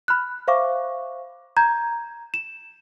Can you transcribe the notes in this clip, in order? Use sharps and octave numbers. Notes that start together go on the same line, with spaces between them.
B5 F6 F#6
C5 E5 F5 C#6 D6
A#5 G6 G#6
E7